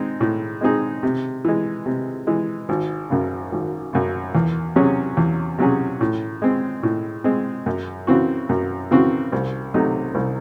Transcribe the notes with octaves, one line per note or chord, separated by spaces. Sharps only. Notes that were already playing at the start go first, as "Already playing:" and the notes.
Already playing: G#3 C4 D#4
A2
G#3 C4 D#4 G#4
C3
E3 G#3
C3
E3 G#3
G#1
F#2 C#3
G#1
F#2 C#3
E2
C3 F#3 C#4 G#4
E2
C3 F#3 C#4 G#4
A2
G#3 C4
A2
G#3 C4
F#2
C#3 E3 C4 F#4
F#2
C#3 E3 C4 F#4
C2
C3 F#3 A3 D#4
C2